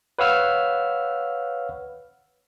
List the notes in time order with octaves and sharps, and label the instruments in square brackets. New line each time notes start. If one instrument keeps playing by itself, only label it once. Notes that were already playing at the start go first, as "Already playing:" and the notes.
[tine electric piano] B4 C#5 F5 F#5 E6 F6